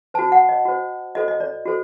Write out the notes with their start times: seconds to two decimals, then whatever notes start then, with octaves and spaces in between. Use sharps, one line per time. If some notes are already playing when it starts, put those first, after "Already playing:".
0.14 C5 A5
0.19 F#4
0.32 F#5
0.49 D#5
0.65 F#4 C5
1.15 F#4 A4 C5 D#5
1.28 D#5
1.40 D5
1.65 F#4 A4 C5